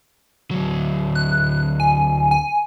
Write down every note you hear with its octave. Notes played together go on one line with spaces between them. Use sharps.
D2 F#3
F#6
G#5
G#5